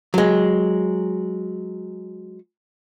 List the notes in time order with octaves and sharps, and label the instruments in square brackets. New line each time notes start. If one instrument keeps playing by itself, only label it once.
[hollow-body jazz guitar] F#3 G#3